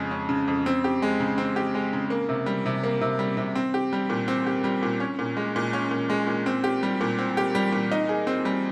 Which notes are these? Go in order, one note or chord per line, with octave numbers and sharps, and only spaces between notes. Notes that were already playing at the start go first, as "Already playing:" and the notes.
Already playing: F2 C#3 G#3 C#4
C#4
C#3
F2
C4
G4
G#3
C#3
C4
G4
G#3
C#3
A#3
C3
G3
C3
A#3
C3
G3
C3
C4
G4
G3
A#2
C4
G4
G3
A#2
C#4
A#2
G#3
A#2
C#4
A#2
G#3
A#2
C4
G4
G3
A#2
C4
G4
G3
A#2
D#4
G#4
C4
G3